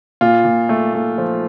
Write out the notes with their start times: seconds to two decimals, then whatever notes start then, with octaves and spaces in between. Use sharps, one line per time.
0.21 A#2 F4
0.45 A#2
0.69 A3
0.94 A3
1.18 F3